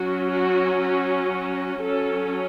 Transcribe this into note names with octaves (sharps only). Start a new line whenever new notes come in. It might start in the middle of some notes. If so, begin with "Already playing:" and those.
Already playing: F#3 C#4 F#4
F#4
F#4
F#4
F#3 C#4 A4